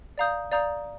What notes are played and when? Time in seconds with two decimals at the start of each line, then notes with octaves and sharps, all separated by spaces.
0.18 D5 F5 A#5 D#6 G6
0.52 D5 F5 A#5 D#6 G6